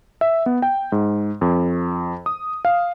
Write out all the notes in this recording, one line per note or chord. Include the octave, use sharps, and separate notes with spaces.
E5
B3
G5
G#2
F2
D#6
F5